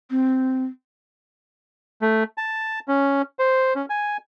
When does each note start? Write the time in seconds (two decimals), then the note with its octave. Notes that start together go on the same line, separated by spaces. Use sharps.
0.11 C4
2.02 A3
2.38 A5
2.88 C#4
3.39 C5
3.75 C#4
3.90 G#5